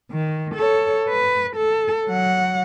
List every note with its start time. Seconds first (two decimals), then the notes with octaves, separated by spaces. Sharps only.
0.11 D#3
0.55 A4 C#5
1.09 B4
1.56 A4
2.07 F#3 F#5